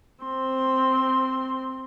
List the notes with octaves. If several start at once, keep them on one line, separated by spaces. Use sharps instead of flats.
C4 C6